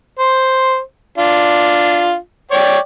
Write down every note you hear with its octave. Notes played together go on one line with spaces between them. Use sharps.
C5
D4 F4
C#5 D5 G5